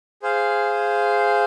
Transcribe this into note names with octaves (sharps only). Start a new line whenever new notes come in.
G#4 C5 F5